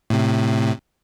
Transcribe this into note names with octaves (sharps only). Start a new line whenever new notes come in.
A2 C3